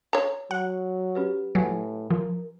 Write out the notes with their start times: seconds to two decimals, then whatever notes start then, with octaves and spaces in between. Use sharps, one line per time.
0.13 C#5 A#5
0.51 F#3 F#5
1.15 C#4 G4 B4
1.55 A2 F#3 B4 F#5 G#5
2.10 F3 A#4